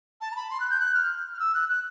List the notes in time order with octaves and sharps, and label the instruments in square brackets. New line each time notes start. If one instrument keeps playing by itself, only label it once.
[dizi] A5
A#5
B5
C6
F#6
G6
F#6
F6
F6
E6
F#6
F#6